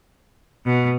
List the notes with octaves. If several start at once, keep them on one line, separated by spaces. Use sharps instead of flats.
B2